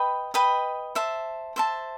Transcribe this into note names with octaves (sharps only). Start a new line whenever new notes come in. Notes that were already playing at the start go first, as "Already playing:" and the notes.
Already playing: B4 D#5 G5 B5
B4 D#5 G5 B5
C5 E5 A5
C5 E5 A5